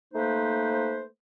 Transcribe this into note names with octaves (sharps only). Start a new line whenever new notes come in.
A3 A#3 D#4 B4 C5